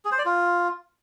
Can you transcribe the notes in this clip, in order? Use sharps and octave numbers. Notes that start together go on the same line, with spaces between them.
G#4
C5
D5
F4